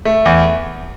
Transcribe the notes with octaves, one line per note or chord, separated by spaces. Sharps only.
A3
E2